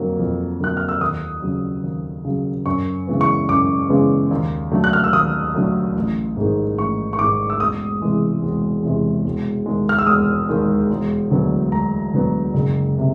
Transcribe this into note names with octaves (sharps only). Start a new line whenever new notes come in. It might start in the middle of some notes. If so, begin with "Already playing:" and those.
Already playing: F2 D3 F#3 A#3
F2
D3 F#3 A#3 F#6
F6
E6
D#2 D#6
C#3 F#3
D#2
C#3 F#3
F#2 C#6
C#3 E3 G#3 B3
C#6
F#2 D6
C#3 E3 G#3 B3
D#2
D3 F#3 A3
F#6
F6
E6
D#2 D#6
D3 F#3 A3
A1
G#2 D#3
A1 C#6
C#6
G#2 D#3 D6
E6
E1 D#6
E2 C3 E3 G#3
E1
E2 C3 E3 G#3
E1
D#2 D#3 G#3
F6
E6
E1 D#6
D#2 D#3 G#3
E1
D2 D3 F#3 B3
E1 A#5
D2 D3 F#3 B3
F#1
C3